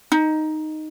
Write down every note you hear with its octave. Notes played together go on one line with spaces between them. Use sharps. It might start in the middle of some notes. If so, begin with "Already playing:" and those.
D#4